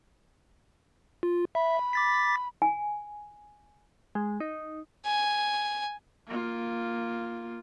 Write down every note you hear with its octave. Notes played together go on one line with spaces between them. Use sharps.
F4
E5 B5
D6 A6 B6
G#5
G#3
D#4
G#5
A#3 F4